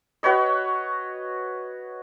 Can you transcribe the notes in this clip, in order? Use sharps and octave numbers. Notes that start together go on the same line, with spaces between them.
F#4 B4 C#5 D#5